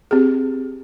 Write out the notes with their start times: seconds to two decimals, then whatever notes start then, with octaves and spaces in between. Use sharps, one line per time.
0.11 C4 G4 G#4